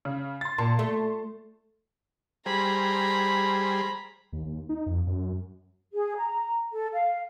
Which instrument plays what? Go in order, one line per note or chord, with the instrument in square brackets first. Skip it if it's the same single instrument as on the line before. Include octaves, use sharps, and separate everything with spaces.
[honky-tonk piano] C#3
C6 A6
[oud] A#2 [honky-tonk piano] A5 C6
[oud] A3
[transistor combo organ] G3 G#4 C5 [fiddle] A#5 B5
[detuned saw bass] D#2
D#2
D#4
F2
F#2
[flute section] G#4
A#5
A4
F5